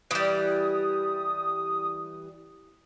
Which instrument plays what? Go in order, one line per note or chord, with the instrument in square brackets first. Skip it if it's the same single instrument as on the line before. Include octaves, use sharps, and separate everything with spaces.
[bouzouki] E3 G3 [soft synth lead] D#6